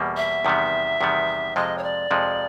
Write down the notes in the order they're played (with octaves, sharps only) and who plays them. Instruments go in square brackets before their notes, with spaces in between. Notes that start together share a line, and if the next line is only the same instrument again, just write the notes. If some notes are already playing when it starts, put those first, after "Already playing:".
Already playing: [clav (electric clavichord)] E2 B2 G3 A#3
[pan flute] E5
[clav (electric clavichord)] E2 C3 D#3 G3 B3
E2 C3 D#3 G3 B3
[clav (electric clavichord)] F2 C3 F3 G#3 [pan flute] D#5
[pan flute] C#5
D5
[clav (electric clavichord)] F2 C3 F3 G#3